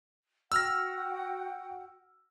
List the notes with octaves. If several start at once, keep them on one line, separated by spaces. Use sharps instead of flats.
F#4 F#5 G5 E6 F6 A#6